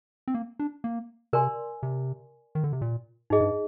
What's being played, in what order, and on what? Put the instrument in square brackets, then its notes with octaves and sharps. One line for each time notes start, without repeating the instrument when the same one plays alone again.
[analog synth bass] C4
A#3
D4
A#3
[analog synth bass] C3 [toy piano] A#4 D5 G#5 C6
[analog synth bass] C3
D#3
D3
C3
A#2
[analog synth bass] G#2 [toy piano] D#4 G#4 D#5
[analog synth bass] G2